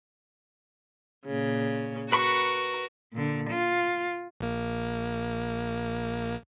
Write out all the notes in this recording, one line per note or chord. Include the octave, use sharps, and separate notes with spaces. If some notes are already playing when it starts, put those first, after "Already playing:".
A#2 C#3
F#4 A#4 B4 B5 C#6
A#2 D3
F4
A#1 A#3